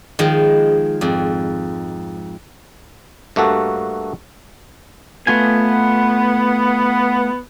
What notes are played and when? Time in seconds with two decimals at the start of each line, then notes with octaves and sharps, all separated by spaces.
0.19 D#3 F3 G#3
1.01 F2 G#2
3.36 G2 A3 A#3 F#4 A4
5.27 A3 B3 F4 G#5